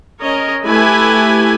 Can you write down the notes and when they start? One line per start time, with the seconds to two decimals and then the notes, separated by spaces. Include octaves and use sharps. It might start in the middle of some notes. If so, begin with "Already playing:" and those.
0.21 C#4 A#4 C#5 D#5
0.64 A3 E4 G4 B4 G#5 B5